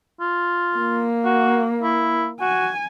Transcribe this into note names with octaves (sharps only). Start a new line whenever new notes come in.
F4
A#3
F#4
E4
F#4 G#5